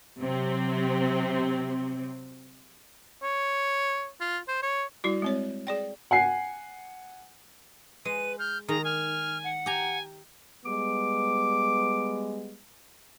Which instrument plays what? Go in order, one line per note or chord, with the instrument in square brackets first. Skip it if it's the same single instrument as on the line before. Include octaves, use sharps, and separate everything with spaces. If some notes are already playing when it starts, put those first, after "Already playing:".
[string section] C3 F#3 C4
[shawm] C#5
F4
C5
C#5
[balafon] G3 E4 F#4
G#3 C4 C#5
G#4 D5 G5
[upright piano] F#5 G#5 C7
[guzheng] G#3 [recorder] B4 [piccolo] D#7
[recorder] F6 [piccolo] G6
[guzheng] D#3 [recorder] G#4 [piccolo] A#5
[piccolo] G#5 [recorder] F6
[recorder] F#5
[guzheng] G4 A#5 [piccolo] G#5
[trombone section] G3 G#3 B3 [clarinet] D6